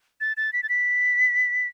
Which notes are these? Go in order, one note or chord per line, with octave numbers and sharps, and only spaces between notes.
A6
A6
B6
A6
B6